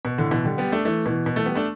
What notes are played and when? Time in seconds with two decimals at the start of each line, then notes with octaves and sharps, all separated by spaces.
0.05 B2
0.18 A2 D3
0.31 B2 E3
0.44 D3 G3
0.58 G3 B3
0.72 A3 D4
0.85 E3 A3
1.06 B2 E3
1.26 B2
1.36 E3 A3
1.46 G3 B3
1.55 A3 D4